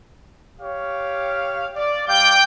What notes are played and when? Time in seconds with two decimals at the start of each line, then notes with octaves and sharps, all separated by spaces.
0.62 G4 C#5 F5
1.76 D5
2.08 G3 F5 G5 D6 G6